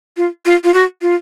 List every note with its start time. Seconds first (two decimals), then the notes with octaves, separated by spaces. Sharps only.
0.17 F4
0.46 F4
0.64 F4
0.74 F#4
1.02 F4